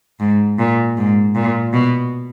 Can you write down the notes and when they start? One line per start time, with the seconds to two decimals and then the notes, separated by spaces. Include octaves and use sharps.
0.20 G#2
0.59 A#2
0.97 G#2
1.35 A#2
1.73 B2